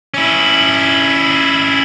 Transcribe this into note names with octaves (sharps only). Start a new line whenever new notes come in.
C#4 E4